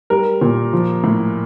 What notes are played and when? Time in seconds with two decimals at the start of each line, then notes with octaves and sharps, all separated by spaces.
0.10 G3 A#4
0.41 A#2
0.73 F3
1.04 A2